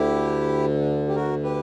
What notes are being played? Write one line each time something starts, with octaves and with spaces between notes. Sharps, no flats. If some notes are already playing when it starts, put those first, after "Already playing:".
Already playing: D2 D3 E4 G4
G4
F#4 A#4
G4 B4